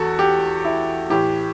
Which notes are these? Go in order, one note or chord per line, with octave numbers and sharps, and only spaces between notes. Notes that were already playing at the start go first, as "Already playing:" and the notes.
Already playing: E2 F#4 A4
G4
E4
A2 E3 G4